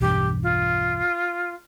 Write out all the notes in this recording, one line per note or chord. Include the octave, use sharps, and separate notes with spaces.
B1 E2 G2 G4
F4